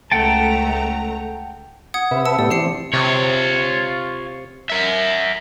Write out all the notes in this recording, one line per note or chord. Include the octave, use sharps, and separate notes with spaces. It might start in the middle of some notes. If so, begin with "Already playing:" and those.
C#2 A3 F#5 G5 A5 A#5
F#5 D#6 G#6
C3 B4 E5
A5 E6 C#7
A2 B3 G4 D5
E3 C4 G4 C7 C#7
C3 F4 C#5
A#4 E5